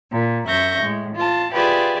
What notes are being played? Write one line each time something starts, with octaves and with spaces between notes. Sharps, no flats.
A#2
F#2 E5 C#6 G6 A#6
A2 G#3
F4 A5
F4 G4 G#4 B4 D5 E5